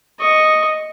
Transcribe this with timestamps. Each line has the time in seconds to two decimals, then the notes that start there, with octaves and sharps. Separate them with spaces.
0.20 D#5 C#6